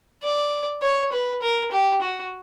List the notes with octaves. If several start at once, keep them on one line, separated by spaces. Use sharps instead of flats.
D5
C#5
B4
A#4
G4
F#4